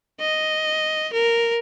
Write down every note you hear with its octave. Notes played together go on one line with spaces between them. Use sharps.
D#5
A#4